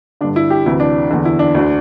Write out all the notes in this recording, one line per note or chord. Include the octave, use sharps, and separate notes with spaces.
G2 D3 D4
E4
G4
D2 C3 E3 E4
D4
E2 D3
E4
D4
D2 D3